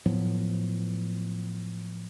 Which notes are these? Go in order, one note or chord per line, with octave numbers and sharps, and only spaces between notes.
A2 F3 F#3 B3